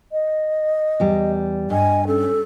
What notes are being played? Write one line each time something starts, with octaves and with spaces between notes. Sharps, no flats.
D#5
E2 G3
G2 D#5 G#5
C#4 A4